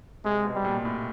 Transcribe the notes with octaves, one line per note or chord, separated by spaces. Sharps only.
C3 G#3
B2
G3
A#2
A2